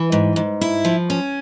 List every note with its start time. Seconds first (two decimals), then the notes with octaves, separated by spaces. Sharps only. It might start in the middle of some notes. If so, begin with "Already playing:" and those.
Already playing: E3
0.12 G#2
0.36 G#2
0.61 E4
0.85 F3
1.10 C#4